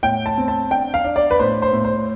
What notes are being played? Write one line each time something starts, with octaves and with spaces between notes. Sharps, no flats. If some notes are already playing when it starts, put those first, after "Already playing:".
A2 G5
A5
C4
A5
D4 G5
F5
D4
D5
B4
A2 C5
C5
A2
C5